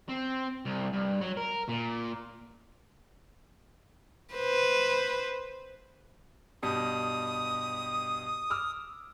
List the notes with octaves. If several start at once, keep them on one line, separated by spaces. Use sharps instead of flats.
C4
C2
G2
F#3
A#4
A#2
B4 C5
G2 B2 G3 D#6
D6 E6 F6